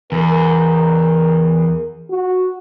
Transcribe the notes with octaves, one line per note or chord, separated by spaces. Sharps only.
E2 A#4
F#4